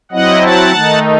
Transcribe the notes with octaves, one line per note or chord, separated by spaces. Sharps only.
F#3 C4 E4 D#5 F#5
F#5 A5
D#3 A3 D#4